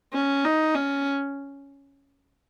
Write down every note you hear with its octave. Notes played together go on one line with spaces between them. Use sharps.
C#4
D#4
C#4